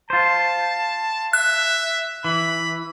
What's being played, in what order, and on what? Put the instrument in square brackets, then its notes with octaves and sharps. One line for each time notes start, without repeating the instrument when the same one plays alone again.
[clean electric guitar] F4 C5 [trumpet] A5
[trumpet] E5 [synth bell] F#6
[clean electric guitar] E3 [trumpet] B5